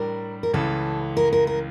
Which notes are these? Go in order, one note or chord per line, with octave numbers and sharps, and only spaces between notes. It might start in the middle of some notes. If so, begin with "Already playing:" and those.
Already playing: A2 G3 D4 A#4
A#4
C#2 C#3 E3 A4
A#4
A#4
A#4